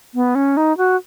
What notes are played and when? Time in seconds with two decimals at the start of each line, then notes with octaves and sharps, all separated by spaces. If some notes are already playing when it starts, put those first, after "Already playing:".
0.15 B3
0.35 C#4
0.57 D#4
0.77 F#4